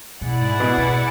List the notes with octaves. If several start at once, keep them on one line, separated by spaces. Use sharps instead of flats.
B2 E4 G#4 D5 F#5
G#2
B2
B2